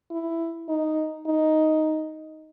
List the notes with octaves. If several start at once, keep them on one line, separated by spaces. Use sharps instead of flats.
E4
D#4
D#4